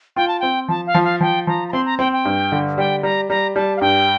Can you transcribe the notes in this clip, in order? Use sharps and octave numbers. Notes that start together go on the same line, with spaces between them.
F4 G5
A5
C4 G5
F3 A5
F5
F3
F5
F3 G5
F3 A#5
A#5
C4 C6
A#5
C4 G5
G5
G2
D3
G3 G5
G3 A#5
G3 A#5
G3 A5
F5
G2 G5